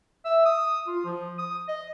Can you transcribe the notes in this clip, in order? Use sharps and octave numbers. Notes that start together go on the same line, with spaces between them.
E5
D#6
F4
F3
D#6
D#5